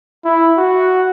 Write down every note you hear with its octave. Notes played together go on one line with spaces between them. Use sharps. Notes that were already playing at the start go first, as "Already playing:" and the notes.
E4
F#4